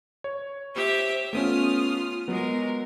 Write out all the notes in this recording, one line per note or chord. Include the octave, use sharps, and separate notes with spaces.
C#5
G4 C5 E5
A3 B3 C#4 F4 D#6 F6
F#3 G#3 B3 A#4